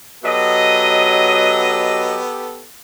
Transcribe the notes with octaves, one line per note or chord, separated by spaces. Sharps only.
F#3 B3 G4 A4 D#5